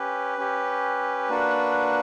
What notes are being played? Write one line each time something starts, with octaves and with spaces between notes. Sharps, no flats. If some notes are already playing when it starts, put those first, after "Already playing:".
Already playing: C#4 G4 B4
C#4 G4
A#3 D4 F#4